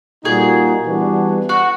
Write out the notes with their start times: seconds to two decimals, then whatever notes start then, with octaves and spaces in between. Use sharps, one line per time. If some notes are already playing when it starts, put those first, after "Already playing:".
0.24 A#2 G3 A#3 D#4 F#4 G#4
0.86 E3 G3 B3 D4 F#4
1.49 F#4